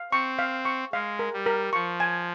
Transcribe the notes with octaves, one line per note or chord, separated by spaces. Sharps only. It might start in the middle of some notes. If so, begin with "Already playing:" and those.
Already playing: F5
C4 C#6
F5
C#6
G#3 F5
A#4
G3
A#4
F3 C#6
G#5